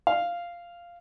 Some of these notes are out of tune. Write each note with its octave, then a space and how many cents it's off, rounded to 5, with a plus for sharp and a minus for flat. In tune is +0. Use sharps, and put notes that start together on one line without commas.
F5 -5